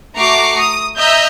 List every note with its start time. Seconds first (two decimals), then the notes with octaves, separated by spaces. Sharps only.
0.17 A3 F#4 A#5 C#6 D6 C7
0.58 D#6
0.98 D#5 E5 A#5 E6 G6